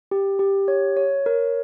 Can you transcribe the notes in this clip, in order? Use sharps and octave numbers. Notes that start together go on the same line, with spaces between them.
G4
G4
C#5
C#5
A#4